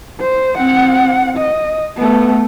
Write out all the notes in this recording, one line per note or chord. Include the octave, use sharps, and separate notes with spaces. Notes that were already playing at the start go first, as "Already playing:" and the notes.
C5
C4 F#5
D#5
A3 B3